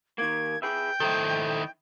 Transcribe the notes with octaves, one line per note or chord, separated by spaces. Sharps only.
D#3 A#3 G#6
G#4 B4 E5 G5
D#3 E4 A4 C5